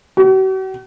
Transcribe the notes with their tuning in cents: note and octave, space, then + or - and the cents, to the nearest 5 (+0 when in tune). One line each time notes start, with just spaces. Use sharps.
F#4 +45